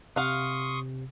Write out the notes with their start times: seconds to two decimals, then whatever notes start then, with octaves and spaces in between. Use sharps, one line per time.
0.16 C3 F5 F#5 C6 C#6 D#6